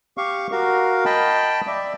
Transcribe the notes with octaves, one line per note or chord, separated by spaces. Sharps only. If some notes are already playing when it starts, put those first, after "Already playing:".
G4 F5 C#6
F#4 A#4 F5
D#5 G5 A5 B5
D5 E5